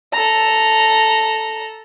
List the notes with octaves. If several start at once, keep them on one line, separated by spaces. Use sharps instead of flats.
A4 A#5